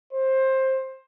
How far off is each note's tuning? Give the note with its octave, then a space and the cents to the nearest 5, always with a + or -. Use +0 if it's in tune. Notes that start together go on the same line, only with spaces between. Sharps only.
C5 +15